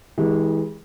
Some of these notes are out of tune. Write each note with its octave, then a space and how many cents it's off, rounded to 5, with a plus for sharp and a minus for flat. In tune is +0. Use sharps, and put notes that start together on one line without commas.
E3 -35 G#3 +0 G4 +0